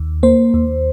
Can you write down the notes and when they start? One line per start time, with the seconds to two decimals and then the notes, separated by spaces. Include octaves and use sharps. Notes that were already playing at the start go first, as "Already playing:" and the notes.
Already playing: D#2
0.23 A#3 C5
0.54 D#2